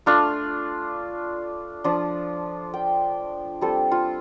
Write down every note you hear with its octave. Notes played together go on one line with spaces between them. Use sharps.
A3 D4 F4 F5
F3 D4 F4
G5
G3 C4 F4 A4
F4